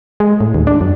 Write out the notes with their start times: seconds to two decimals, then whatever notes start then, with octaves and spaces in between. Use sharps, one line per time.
0.20 G#3
0.41 A2
0.54 D#2
0.67 D4
0.81 F#2